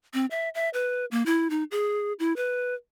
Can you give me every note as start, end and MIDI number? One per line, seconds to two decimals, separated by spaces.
0.14 0.26 60
0.31 0.49 76
0.55 0.69 76
0.74 1.05 71
1.11 1.25 58
1.26 1.48 64
1.50 1.64 63
1.71 2.13 68
2.19 2.35 64
2.36 2.74 71